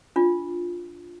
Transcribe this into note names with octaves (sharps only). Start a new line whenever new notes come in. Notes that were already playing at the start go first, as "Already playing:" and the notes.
D4 F4